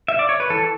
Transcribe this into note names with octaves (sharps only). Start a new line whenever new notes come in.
E5
D5
C#5
B4
E3 A4